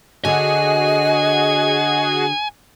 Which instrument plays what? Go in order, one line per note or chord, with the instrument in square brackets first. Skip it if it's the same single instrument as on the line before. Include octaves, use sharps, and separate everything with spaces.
[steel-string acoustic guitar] D3 C#5 [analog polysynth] F#4 G#4 [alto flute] D#5 [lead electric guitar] G#5